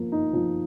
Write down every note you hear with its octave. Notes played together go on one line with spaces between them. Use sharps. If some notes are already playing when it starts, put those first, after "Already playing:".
Already playing: F3 A#3
D#4
F3